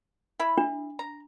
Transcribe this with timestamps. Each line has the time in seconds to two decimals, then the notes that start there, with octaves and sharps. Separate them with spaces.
0.39 E4 E5 B5
0.58 D4
0.99 A#5